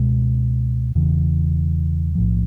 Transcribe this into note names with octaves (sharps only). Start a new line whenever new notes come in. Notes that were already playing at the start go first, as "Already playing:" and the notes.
Already playing: C#2 B2 G#3
E1 E2 C#3 E3
B1 A2 F3